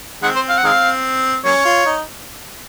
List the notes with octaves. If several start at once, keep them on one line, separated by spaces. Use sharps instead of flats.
D#3 G#3 C4 F#5
C5
F5
F#5
D#3 G#3 C4 F5
F#3 A#3 C#4 C#5
F4
D#4